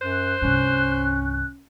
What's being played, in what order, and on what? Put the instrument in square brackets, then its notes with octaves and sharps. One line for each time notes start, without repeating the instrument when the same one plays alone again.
[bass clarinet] F#2 [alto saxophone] C5 [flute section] F#6
[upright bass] C2 G2 [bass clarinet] C#4